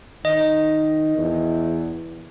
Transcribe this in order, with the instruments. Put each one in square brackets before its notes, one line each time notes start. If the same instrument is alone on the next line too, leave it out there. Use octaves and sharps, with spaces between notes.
[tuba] D#3 [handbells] D#5
[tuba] E2